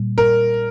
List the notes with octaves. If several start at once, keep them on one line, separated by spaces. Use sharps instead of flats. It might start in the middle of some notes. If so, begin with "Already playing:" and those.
Already playing: A#2 G3
A#4